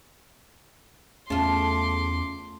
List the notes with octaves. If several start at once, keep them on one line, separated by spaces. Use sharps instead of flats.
E2 C#3 A3 F4 C6 D6